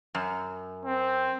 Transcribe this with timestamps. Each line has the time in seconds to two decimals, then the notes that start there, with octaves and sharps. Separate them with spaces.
0.15 F#2
0.86 C4